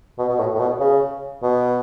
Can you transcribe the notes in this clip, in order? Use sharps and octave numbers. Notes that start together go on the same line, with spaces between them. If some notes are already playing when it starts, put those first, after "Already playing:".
B2
B2
A2
A2
B2
C#3
B2